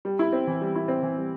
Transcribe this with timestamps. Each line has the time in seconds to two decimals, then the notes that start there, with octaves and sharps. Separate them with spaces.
0.05 G3
0.19 E4
0.33 C4
0.47 E3
0.61 G3
0.76 E4
0.88 C4
1.02 E3
1.17 G3